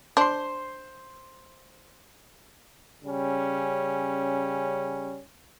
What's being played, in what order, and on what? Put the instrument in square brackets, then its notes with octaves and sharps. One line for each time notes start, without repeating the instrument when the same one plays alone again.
[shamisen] D4 [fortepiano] C5 C6
[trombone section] C#3 G3 C#4